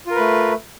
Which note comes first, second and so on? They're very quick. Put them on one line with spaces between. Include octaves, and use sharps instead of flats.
F4 A#4 B4 A3